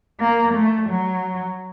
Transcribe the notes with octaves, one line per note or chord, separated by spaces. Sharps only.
A#3
A3
F#3